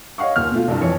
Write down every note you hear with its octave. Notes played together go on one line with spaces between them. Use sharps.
C#5 D#5 F5 F#5 C#6
D#1 A#2 F6
B2 A3 F4
C2 G2
F2 E3 C#5 C#7